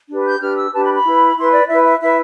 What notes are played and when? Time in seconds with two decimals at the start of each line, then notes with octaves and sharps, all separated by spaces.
0.10 D4 G4 B4
0.26 G6
0.41 D4 G4 B4 F6
0.57 E6
0.73 D4 G4 B4 A5
0.83 B5
0.94 B5
1.06 E4 B4
1.36 E4 B4 C6
1.53 D5
1.68 E4 B4 E5
1.84 E5
2.00 E4 B4 E5